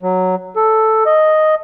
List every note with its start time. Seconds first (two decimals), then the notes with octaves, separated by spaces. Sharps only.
0.03 F#3
0.56 A4
1.06 D#5